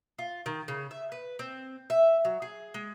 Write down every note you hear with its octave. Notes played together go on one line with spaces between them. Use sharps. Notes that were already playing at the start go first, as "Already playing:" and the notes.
F4
D#3
C#3
E5
B4
C4
E5
F#3
G#4
G#3